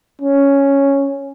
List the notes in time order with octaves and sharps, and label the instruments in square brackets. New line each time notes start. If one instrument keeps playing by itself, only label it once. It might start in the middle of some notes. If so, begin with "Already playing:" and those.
[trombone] C#4